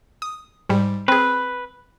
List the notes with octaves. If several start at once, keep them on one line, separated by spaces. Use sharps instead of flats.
D#6
G#2 G3
C4 G#4 B4